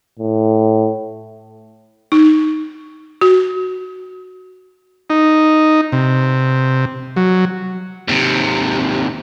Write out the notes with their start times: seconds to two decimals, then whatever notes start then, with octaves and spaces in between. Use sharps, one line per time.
0.20 A2
2.12 D#4
3.21 F#4
5.10 D#4
5.92 C3
7.16 F#3
8.08 D#2 C3